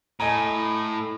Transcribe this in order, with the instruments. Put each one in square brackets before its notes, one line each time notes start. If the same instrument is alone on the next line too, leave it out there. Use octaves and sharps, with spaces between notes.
[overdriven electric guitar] A2 [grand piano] D#5 G#5 A#5